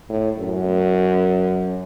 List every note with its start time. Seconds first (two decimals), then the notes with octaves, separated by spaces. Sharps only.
0.10 A2
0.38 F#2